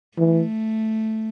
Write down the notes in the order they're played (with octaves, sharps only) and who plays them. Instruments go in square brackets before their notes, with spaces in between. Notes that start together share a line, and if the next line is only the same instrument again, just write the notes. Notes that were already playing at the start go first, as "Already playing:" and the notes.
[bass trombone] E3 [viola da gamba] A3